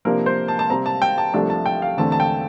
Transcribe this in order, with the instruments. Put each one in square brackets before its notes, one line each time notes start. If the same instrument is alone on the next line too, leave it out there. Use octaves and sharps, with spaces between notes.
[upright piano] C3 F3 A#3 D4 A#4
C5
A5
A5
C3 G3 C4 A#5
A5
G5
A5
C2 C3 F3 A3 D4 A5
A5
G5
F5
E2 D3 A3 C4 A5
A5
G5